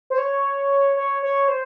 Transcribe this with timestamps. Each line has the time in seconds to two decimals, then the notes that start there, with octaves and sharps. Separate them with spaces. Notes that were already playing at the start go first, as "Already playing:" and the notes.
0.10 C5
0.18 C#5
0.97 C#5
1.23 C#5
1.48 C5